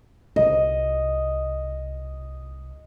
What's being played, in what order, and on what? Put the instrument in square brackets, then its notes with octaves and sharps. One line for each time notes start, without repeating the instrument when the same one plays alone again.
[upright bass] C2 [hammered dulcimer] D#5